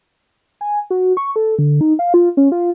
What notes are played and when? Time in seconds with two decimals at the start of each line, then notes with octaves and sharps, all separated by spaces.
0.61 G#5
0.90 F#4
1.17 C#6
1.36 A4
1.59 D3
1.81 D#4
1.99 F5
2.14 F4
2.37 C#4
2.52 F4